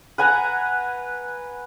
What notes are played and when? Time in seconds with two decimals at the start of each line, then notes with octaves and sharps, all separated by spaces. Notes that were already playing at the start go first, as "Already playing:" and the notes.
0.18 B4 F#5 G#5 A#5